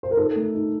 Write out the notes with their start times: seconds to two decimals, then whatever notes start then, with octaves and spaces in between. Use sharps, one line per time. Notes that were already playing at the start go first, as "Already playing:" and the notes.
0.03 C5
0.11 A#4
0.17 D#4 A4
0.36 A3
0.55 D#4